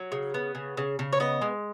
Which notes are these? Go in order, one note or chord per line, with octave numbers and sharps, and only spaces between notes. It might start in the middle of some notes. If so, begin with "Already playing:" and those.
Already playing: F#3
C#3
B3
C#3
C#3
C#3
C#5
B3 D#5
G#3